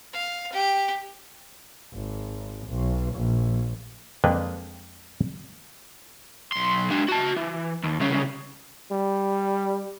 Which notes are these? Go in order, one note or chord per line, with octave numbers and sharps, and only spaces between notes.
F5
G4
G#1
B1
A#1
F2 G#3 A#3 D4 B4 G5
B1 C6
G#3 D4
F#4 A5
E3
D#2
C2 C#3
G3